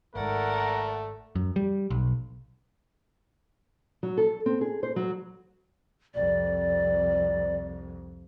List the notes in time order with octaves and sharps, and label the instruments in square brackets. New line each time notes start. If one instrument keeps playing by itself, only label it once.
[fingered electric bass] G#1 G#2 [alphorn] A3 [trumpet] A#4 [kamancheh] D5 F#5
[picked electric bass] F#2
G3
B1
[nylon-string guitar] F#3
A4
C4
G#4
C5
F#3
[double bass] C2 F2 [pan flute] D5